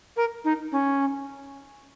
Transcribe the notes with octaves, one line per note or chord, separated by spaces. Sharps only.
A#4
D#4
C#4